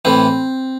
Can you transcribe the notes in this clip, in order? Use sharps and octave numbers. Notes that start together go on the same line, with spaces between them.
A2 E3 C4